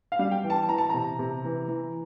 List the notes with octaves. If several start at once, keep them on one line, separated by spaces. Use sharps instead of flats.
F5
G3
G5
E3
A5
E3 A#5
A5
C3 A#5
C3
E3
E3